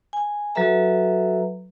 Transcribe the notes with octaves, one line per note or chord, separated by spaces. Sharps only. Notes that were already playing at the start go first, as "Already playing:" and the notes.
G#5
F#3 F#4 A4 B4 E5 A#5